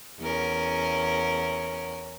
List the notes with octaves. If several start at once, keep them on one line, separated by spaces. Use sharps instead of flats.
E2 C#4 A#4